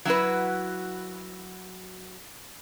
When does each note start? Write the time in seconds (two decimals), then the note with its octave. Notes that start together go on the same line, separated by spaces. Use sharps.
0.05 F#3 E4 F#4 B4